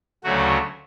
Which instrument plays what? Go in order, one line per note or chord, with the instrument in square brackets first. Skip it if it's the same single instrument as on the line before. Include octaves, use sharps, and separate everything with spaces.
[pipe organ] D2 C#3 F#3 A3 F#4